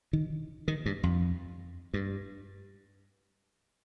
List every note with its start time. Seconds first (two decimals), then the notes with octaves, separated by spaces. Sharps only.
0.13 D#3
0.68 D#3
0.86 G2
1.03 F2
1.94 G2